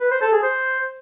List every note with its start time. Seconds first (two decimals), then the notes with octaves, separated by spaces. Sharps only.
0.01 B4
0.11 C5
0.22 A4
0.32 G#4
0.43 C5